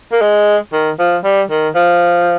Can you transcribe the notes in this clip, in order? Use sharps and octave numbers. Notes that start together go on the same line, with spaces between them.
A#3
G#3
D#3
F3
G3
D#3
F3